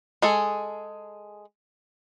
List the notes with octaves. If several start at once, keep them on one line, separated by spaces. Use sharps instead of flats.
G#3 G#4 A4